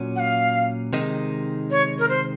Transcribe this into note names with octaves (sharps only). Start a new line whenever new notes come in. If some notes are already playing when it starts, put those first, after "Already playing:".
Already playing: A#2 F#3 C#4
F#5
F5
C3 D#3 G#3 D#4
C#5
A#4
C5